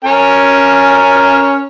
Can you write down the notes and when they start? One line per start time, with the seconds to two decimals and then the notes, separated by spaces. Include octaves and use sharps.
0.04 C#4 A#4 G#5